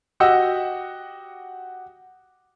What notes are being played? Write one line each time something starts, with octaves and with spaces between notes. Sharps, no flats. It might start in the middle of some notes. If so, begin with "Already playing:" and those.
F#4 G4 D#5 F#5 E6